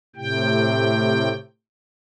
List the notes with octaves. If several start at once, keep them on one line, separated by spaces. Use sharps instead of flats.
A2 C3 G5